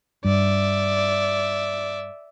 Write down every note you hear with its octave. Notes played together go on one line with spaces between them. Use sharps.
G2 D5 E5